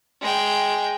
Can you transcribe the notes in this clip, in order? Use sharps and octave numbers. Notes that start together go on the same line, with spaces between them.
G#3 G5